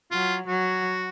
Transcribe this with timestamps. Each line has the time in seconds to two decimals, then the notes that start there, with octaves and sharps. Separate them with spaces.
0.11 F#3 F4
0.47 F#3 F#4